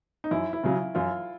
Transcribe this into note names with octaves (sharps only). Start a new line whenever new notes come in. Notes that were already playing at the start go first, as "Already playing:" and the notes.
D#4
F#2 E4
E4
C#3 F#3 F4
F#2 F4